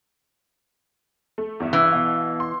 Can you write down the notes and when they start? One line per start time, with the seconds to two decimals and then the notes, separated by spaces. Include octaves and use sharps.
1.38 A3
1.60 E2 G2 E5
1.73 E3
1.92 B2 F5
2.40 C6